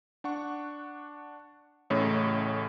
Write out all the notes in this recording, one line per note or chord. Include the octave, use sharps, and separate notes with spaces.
D4 F#5 C#6
A1 A2 C#3 C#5